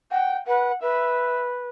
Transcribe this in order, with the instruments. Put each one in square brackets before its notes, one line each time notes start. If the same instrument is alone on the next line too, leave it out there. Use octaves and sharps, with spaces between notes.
[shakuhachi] F#5 [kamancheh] G5
[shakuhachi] B4 [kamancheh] F#5
[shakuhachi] B4 [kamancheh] E5